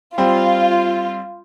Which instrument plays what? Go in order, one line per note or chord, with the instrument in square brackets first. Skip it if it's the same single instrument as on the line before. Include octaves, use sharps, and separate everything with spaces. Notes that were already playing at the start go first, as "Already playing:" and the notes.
[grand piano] G3 C4 [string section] F4